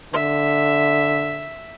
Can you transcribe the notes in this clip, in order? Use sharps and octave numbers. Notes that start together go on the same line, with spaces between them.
D3 E5